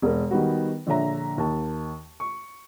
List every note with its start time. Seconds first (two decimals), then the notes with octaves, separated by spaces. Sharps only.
0.02 E1 A#4
0.31 D#3 G3 B3 F#4
0.87 A#1 D3 C#5 E5 A#5
1.38 D#2 A5
2.20 C#6